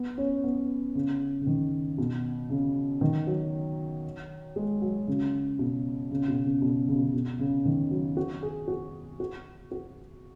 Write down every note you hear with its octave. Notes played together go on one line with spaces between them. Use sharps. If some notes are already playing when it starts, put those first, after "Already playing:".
Already playing: B3
C#4
B3
C#3
C#3
D#3
B2
C#3
D#3
F#3
G#3
F#3
C#3
B2
C#3
B2
C#3
B2
C#3
B2
C#3
B2
C#3
D#3
F#3
F#4
G#4
F#4
F#4
F#4